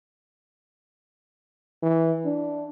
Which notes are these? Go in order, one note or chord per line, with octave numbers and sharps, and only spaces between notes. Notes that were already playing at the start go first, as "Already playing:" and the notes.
E3
D4